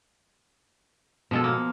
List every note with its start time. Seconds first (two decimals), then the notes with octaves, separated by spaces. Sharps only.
1.31 B2 F3 G#3 A4
1.44 A#3